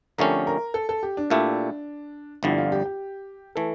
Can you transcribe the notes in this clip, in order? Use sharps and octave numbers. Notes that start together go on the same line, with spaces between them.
F2 D3 A3 C#4 G4 A#4
A#4
A4
A4
G4
D4
A#2 A3 E4 G4
G1 F2 D3 G3 E4
F4
G4
G4
E3 A3 A4